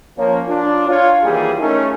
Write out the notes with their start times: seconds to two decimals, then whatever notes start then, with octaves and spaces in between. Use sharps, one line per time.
0.17 F3 A#3 C#4 C#5
0.48 D4 F4
0.89 F4 C#5
1.23 D#3 E3 G3 A#3 G#4
1.59 A3 C#4 D#4 A#4